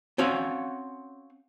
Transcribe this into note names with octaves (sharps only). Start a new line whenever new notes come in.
C4 C#4 F#4 F5